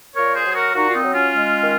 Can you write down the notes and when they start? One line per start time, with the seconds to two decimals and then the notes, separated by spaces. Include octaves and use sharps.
0.15 A#2 A#4 C#5
0.35 G#4 C5
0.46 F#3
0.51 G#4
0.55 F#4 A#4
0.74 A#2 D#4 F#4
0.88 F4
0.94 C4 D#4
1.04 F#3
1.14 C#4 F4
1.33 G#3
1.63 D#3